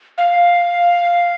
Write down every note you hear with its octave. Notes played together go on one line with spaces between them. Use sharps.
F5